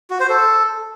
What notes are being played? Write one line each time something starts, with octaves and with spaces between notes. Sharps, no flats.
F#4
C5
A4